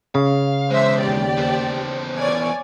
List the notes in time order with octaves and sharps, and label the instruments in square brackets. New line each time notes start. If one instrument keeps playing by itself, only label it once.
[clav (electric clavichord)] C#3 [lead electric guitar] F5
[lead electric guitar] E3 G#3 [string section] C5 E5
[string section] D#2 G4 D5
[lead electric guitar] E2 C5
[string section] C#5 D5 G#5